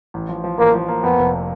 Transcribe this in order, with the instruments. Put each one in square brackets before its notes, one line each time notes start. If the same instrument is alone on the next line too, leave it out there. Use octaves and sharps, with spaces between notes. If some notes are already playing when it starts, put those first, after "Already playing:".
[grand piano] A1
F3
F3
[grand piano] A1 [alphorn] A#3
[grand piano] F3
A#3
[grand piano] F2 [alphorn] B3
[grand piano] F1